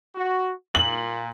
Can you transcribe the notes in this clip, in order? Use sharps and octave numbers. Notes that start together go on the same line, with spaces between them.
F#4
A#2 F#7